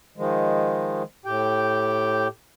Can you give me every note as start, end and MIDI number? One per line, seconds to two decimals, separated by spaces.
0.17 1.03 51
0.17 1.03 53
0.17 1.03 56
1.25 2.28 45
1.25 2.28 67
1.25 2.28 79